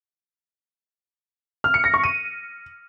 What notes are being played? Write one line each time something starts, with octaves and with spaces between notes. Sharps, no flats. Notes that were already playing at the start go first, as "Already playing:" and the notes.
F6
C#7
A#6
C#6
D#7